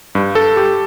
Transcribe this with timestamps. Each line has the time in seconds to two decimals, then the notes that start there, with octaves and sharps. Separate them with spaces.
0.15 G2
0.35 A4
0.56 G4